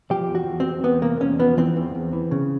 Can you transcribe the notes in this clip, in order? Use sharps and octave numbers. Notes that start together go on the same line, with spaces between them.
F3 G4
E2
F#4
E2
C4
E2
E2 B3
C3 A#3
E2 C#4
F3 B3
E3 C4
E2
E2
E3
C#3